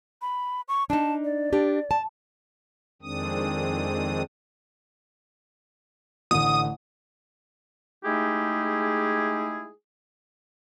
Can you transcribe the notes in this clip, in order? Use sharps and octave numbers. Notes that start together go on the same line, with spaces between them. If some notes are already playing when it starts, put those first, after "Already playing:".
B5
C#6
D4 D#4 A5
D5
D4 G4
A5
F2 D#3 G#3 C4 D4 D#6
A1 D3 D#6
G#3 A3 D#4 E4 G4 G#4